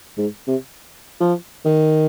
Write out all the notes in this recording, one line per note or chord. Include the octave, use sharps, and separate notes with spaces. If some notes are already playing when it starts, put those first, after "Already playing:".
G#2
C3
F3
D#3